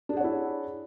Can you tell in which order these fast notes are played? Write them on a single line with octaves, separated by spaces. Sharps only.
D4 G#4 F#5 C#5 E4